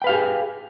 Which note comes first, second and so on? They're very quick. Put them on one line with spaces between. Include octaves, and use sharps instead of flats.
G5 B4 F5 G4 G#4